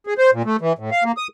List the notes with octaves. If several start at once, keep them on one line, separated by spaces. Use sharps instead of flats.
G#4
C5
A#2
A3
E3
A2
F5
A#3
D#6